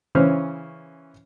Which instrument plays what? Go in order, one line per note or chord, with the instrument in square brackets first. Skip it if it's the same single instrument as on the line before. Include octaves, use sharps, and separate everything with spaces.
[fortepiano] C#3 E3 C#4 C5 F6